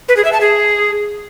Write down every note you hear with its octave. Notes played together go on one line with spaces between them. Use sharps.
B4
G#4
E5
A5
G#4